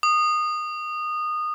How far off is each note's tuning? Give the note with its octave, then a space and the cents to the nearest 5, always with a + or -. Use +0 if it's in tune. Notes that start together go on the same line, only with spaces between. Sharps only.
D#6 -20